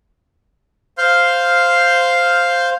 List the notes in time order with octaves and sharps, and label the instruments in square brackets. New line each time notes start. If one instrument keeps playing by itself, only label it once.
[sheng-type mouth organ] C5 F5 C6 F6 G6